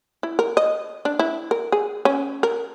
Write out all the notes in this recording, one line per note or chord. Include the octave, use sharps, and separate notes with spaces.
E4
A#4
D#5
D4
E4
A#4
G#4
C#4
A#4